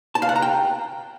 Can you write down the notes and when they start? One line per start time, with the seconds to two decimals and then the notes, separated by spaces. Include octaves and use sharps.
0.15 A5
0.22 F5
0.29 F#5
0.36 A#5
0.42 G5